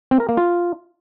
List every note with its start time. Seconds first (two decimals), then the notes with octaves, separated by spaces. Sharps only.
0.11 C4
0.20 A#4
0.29 A#3
0.37 F4